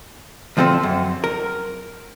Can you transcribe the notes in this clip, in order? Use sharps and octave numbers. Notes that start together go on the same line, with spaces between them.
D2 F3 C4 A4 C5
F#2
A#4